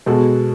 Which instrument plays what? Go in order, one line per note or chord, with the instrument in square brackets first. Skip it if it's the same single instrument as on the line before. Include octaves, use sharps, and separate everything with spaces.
[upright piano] B2 G#3 B3 F#4 A4